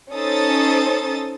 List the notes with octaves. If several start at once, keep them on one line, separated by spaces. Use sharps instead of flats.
C#4 D#4 A4 C5 D#6 A6